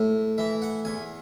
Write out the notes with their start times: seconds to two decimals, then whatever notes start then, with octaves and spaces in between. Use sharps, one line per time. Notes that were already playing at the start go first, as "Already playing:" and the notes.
Already playing: A2
0.38 E3 E5
0.62 F#5
0.85 E2 G#5